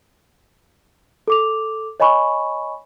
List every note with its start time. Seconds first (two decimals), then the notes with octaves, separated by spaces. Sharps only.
1.28 A4 D6 F7
2.00 C#5 D#5 G#5 B5 C#6